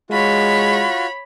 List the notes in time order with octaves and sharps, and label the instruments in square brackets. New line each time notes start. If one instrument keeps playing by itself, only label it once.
[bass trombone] G#3 [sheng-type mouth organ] F4 F#4 [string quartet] C#5 B5